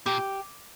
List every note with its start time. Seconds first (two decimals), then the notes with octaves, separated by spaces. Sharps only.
0.06 A#2 G4